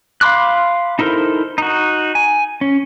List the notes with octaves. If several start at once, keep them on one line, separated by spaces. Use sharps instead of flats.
F5 B5 C6 D6 F#6
D#4 E4 A4 A#4 C5
D#4 F#4
G#5
C#4